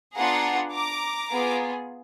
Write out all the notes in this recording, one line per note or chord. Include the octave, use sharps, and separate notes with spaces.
B3 D4 F4 G#4 F#5 A#5
A#5 D6
B3 F4 G#4